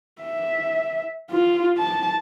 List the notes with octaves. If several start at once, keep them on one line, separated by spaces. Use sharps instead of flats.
E5
F4
A5